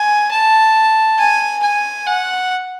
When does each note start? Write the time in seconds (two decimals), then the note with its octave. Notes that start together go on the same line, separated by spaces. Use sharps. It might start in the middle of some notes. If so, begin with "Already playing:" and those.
Already playing: G#5
0.31 A5
1.19 G#5
1.63 G#5
2.07 F#5